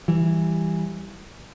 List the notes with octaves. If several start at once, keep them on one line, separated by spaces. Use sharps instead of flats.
E3 G3